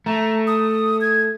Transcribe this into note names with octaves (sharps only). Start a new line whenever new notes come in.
A3 A#5
D#6
G#6